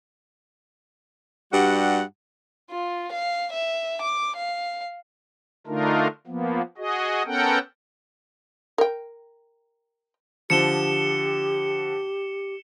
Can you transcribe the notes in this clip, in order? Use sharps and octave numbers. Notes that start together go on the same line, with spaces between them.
G2 G3 F#4 F#5
F4
F5
E5
D6
F5
D3 A3 D4 D#4 F4 A#4
F3 A#3 B3
F#4 G#4 D#5
B3 C#4 A4 A#4 F#5 G5
A#4 G5
D3 F3 G4 C#7 E7 G7